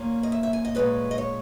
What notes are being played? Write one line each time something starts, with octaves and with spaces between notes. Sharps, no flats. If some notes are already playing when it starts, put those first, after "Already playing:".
Already playing: A#2 A#3 C#4
D#5
E5
E5
G#5
D#5
A#2 G#3 C#4 B4
D#5
C#5